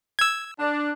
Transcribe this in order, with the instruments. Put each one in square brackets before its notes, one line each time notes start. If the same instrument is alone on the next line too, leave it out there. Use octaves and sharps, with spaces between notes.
[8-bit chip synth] E6 G#6
[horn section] D4